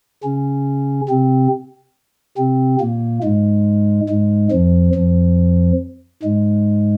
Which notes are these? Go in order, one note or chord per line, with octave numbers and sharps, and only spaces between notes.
C#3 C#4
C3 C4
C3 C4
A#2 A#3
G#2 G#3
G#2 G#3
F2 F3
F2 F3
G#2 G#3